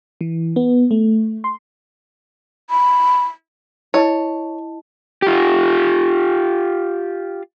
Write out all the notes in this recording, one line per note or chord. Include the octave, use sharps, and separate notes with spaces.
E3
B3
A3
C6
B5
E4 C#5 D#5 A5
F4 G4